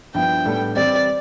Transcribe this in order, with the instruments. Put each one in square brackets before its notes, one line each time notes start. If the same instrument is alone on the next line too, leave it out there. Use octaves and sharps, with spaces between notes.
[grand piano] G2 F3 B3 E4 [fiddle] G5
[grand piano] A2 G3 B3 D4 A4
[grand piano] E3 G3 C4 G4 [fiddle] D5